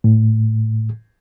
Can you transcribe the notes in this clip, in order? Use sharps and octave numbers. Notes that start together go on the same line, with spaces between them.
A2